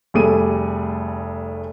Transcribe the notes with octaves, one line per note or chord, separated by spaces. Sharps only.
F1 G3 A3 G#4 D#7